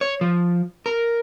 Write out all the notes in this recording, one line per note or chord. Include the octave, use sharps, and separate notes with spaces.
C#5
F3
A#4